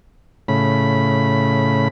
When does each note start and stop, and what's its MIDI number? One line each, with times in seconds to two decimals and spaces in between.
0.48 1.88 45
0.48 1.88 49
0.48 1.88 83